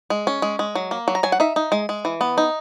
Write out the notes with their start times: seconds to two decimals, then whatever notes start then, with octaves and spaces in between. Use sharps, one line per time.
0.10 G#3
0.27 C#4
0.42 G#3
0.59 G#3
0.75 F#3
0.91 A#3
1.08 F#3
1.15 A#5
1.23 F#3 G#5
1.32 F#5
1.40 D#4 E5
1.56 D#4
1.72 G#3
1.89 G#3
2.05 E3
2.21 B3
2.38 D#4